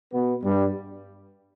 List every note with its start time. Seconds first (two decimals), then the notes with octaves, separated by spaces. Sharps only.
0.12 B2 B3
0.44 G2 G3